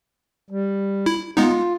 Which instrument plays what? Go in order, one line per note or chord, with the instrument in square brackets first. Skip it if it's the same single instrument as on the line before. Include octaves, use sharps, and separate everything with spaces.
[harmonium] G3
[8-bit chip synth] E4
[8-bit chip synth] G#3 B3 D#4 [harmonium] F4